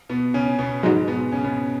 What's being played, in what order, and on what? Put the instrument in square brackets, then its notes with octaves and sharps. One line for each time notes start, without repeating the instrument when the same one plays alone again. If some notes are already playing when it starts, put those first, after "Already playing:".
[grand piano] B2 B3
C#3 C#4
B2 B3
[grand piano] G#2 G#3 [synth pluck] F#3 D#4 F#4
[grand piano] B2 B3
C#3 C#4
B2 B3